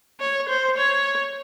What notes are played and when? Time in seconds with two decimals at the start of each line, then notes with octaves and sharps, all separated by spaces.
0.20 C#5
0.49 C5
0.77 C#5